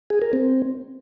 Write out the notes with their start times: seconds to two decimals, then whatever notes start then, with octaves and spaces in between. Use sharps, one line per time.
0.10 G#4
0.22 A#4
0.33 C4